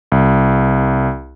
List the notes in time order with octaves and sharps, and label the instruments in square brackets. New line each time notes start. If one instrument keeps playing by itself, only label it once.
[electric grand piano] C2